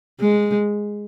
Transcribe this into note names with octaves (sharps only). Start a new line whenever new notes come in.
G#3